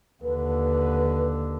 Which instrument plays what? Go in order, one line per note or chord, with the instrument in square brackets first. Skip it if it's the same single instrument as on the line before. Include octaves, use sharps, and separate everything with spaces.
[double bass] D#2 D3 [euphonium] B4